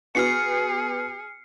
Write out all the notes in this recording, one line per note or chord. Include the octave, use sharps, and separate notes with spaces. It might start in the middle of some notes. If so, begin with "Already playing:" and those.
B3 F#4 G#4 F6 C7 C#7